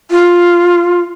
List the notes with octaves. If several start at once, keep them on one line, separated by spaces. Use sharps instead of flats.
F4